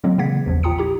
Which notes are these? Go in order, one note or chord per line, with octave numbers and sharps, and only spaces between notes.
A#2 D3 F#3 G#3 A#3 C4
C#3 E3 A#3 F#5 G#6 B6
A1 E2 F3
A#2 F4 G5 A#5 D#6 C#7
E4 G4 A#5